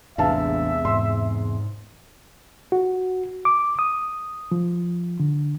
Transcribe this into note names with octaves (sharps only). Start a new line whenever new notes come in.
A1 E2 C3 G#3 D4 E5 F5 A5
G#2 C6
F#4
D6
D#6
F3
D3